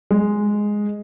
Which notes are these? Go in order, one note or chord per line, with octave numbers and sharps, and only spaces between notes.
G#3